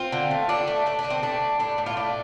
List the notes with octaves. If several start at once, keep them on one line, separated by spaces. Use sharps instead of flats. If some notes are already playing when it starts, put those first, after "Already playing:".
Already playing: C4 F4
D3
A3
D3 D4
A3
A3 D4
D4
D3
C4
A3 D4
A3
A2 D4
A2
F4
A3 D4